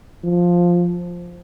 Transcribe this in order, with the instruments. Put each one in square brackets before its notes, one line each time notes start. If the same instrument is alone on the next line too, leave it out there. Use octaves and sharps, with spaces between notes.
[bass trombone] F3